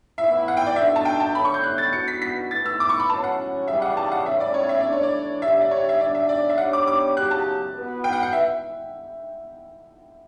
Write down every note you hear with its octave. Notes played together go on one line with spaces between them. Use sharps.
A2 E3 B3 E4 B4 E5
F#5
G5
D5
B2 A3 D4 E5
A5
G5
A5
D3 A3 E4 A4 C#5 B5
C#6
G6
F#6
A6
E3 B3 D4 F#4 C#7
B6
B6
A3 E4 B4 A6
E6
D6
C#6
B5
A2 F#3 C#4 A5
F#5
C#3 E3 G3 E5
F#5
A5
F#5
A2 G3 C#4 E5
D5
C#5
E5
E3 A3 D4 D5
C#5
D5
D3 G3 D4 G4 E5
E5
D5
C#5
E5
D3 G3 D4 D5
E5
D5
E5
G3 D4 G4 C#5 F#5
D6
D6
C#3 F#3 C#4 G4 F#6
A5
E3 B3 F#4 B4
G5
F#5
F#5
E5